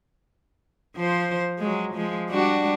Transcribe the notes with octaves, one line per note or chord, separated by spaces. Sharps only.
F3 C5
F#3 G#3
F3 G#3
G3 D4 F#4